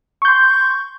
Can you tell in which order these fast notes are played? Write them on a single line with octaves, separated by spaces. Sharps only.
C#6 G6 C6